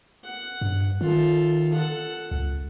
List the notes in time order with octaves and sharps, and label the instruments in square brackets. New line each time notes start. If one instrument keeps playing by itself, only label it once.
[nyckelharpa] F#5
[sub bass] G2
[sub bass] D#3 [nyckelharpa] F4 A4
[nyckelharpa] A4 F#5
[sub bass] C#2